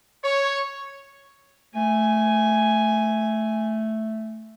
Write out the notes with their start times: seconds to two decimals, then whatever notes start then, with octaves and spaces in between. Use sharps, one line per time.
0.24 C#5
1.75 A3 G#5